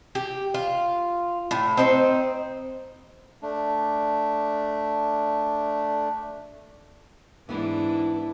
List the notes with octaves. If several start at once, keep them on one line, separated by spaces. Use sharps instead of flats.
G4
F4
A2
C4 D#4 C5
A3 D4
G#2 E3 B3 D4 E4